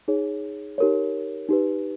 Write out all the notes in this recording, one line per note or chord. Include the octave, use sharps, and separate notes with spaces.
D#4 G#4 C#5
D#4 G4 A#4 C#5
D#4 G4 B4